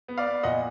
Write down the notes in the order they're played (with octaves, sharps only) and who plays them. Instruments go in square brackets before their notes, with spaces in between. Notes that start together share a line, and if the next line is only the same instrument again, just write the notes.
[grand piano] B3
D5 F5
B3
A#2 D#5 F#5